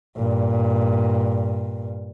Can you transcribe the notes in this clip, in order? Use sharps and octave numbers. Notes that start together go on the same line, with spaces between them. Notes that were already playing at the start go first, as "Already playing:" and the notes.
G2 A#2